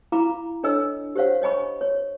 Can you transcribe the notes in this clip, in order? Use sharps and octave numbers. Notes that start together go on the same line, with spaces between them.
E4 F5 A#5 B5 D6
D4 A4 C#5 D#5 G#5 E6
G4 C5 C#5 F5 F#5
C#5 D#5 G#5 B5 C#6
C#5